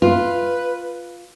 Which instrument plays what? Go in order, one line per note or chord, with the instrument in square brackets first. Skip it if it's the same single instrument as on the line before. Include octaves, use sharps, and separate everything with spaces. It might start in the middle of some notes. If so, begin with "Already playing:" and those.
[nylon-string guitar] F4 [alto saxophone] B4